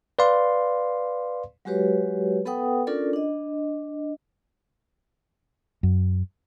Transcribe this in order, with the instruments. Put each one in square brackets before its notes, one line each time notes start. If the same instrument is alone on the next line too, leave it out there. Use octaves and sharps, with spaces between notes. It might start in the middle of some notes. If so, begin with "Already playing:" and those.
[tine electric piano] B4 D5 F5 C6
[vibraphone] F#3 G#3 F#4 G4 B4 C#5
B3 A4 B4 F#5 G5 D#6
C#4 D4 F4 A4 A#4 D5
D4 D#5
[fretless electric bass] F#2